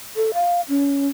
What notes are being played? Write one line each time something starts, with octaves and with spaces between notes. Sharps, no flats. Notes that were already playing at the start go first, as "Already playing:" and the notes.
A4
F5
C#4